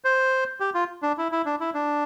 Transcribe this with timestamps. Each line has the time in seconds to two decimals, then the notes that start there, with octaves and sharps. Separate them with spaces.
0.04 C5
0.60 G4
0.74 F4
1.03 D4
1.18 E4
1.32 E4
1.46 D4
1.60 E4
1.74 D4